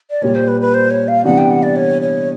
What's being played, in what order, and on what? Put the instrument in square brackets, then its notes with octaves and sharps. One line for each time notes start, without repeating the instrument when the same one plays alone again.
[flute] D5
[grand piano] A#2 G3 A#3 [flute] C#5
[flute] C5
B4
B4
C5
C#5
F5
[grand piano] C3 E3 G3 B3 D4 [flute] F#5
[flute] G5
F#5
D5
C#5
C#5